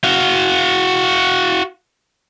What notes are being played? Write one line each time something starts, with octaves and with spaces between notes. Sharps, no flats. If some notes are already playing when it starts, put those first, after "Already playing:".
F#4 F5